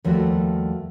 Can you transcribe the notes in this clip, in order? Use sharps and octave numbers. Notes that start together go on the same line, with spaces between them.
D#2 F3 G3 A3 F#4